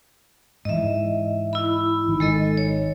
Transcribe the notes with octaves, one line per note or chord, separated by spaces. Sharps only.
G#2 E3 D#5 E5
E4 B5
G#1 D#3
G#3 A4 D#5
C#5